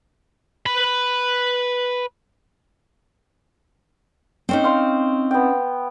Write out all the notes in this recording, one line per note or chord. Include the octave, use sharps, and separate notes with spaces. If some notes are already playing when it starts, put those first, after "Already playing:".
B4 B5
C4 C#4 D#4
F5 C6
B3 G5